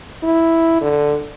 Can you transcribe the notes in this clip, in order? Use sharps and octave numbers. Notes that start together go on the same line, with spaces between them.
E4
D3